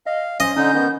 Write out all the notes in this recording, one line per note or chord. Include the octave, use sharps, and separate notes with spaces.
D#5 F5
C#4 C5 D#5
D3 C#4 D#4 G6
D#3 B3